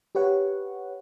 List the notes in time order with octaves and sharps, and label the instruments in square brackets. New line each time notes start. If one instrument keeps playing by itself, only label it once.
[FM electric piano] G4 B4 C#5 F#5